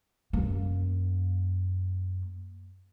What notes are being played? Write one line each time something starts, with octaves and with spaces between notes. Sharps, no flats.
F#2 A#3